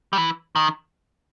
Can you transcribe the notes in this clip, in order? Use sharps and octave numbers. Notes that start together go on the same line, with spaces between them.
G3
E3
D#3